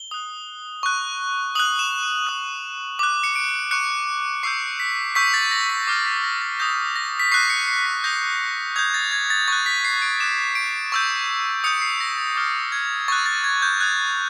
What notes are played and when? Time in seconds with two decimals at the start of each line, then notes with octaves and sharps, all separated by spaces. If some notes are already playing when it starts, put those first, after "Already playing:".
Already playing: G7
0.11 D#6 F#6
0.83 C#6 F#6
1.55 D#6 F#6 F#7
1.79 E7
2.03 D#7
2.27 D#6 F#6
2.99 D6 F#6
3.24 C#7
3.36 D7
3.71 C#6 F#6 C#7
4.43 C#6 E6 G6 C7
4.80 B6
5.15 C#6 E6 G6 B6
5.34 A6
5.51 A#6
5.70 B6
5.87 D6 F6 C7
6.06 B6
6.24 A#6
6.42 A6
6.59 D#6 G6 A#6
6.96 A#6
7.20 B6
7.32 C#6 F#6 C7
7.50 C#7
7.68 C7
7.86 B6
8.04 D#6 G6 A#6
8.76 D#6 G6 G#6
8.94 A6
9.12 G#6
9.30 A6
9.48 C#6 F#6 A6
9.66 B6
9.84 C7
10.02 D7
10.20 D6 F#6 E7
10.55 D7
10.92 C#6 E6 G6
11.64 D#6 G6 C#7
11.82 C7
12.01 A#6
12.18 A6
12.36 D6 F6 A6
12.72 G#6
13.08 C#6 F#6 A6
13.26 A6
13.44 G#6
13.62 G6
13.80 D#6 F#6 G#6